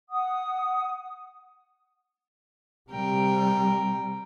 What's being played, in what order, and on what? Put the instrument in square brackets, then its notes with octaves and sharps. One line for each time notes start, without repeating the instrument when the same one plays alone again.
[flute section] F#5 D#6
[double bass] C3 G3 [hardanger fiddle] A#4 G5